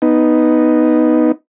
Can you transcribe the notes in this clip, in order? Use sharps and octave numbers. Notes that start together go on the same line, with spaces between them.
B3 D#4